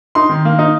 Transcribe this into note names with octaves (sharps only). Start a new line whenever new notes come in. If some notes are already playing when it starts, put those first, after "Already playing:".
D#4 C6
D#3
A#3
D#4